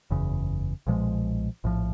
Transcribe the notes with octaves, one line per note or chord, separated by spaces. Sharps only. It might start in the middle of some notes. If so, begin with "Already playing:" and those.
F#1 E2 C#3
B1 A#2 F3 G#3
A#1 A2 F3